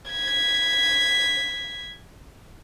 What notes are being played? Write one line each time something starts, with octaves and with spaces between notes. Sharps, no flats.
G#6 B6